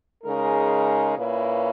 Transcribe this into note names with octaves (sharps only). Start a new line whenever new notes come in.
C#3 G#3 D#4 A#4
A#2 A#3 C#4 E4 B4